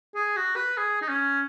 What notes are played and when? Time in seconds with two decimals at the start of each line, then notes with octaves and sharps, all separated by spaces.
0.15 G#4
0.36 F#4
0.56 B4
0.77 G#4
1.01 D#4
1.08 C#4